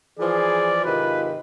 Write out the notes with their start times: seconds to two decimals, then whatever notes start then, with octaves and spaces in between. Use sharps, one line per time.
0.19 E3 F3 G#4 D5
0.85 G#2 C3 D#3 F4 B4